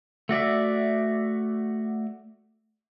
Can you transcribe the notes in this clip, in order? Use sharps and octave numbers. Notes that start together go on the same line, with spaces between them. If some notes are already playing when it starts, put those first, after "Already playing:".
A3 F#4 D5 E5